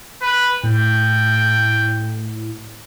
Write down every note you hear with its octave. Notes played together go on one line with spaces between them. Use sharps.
B4
A2 G5